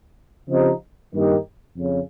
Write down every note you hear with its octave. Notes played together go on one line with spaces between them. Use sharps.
C#3 F3 C4 D#4 G4
G2 D#3 A#3 D#4 G4
F2 C#3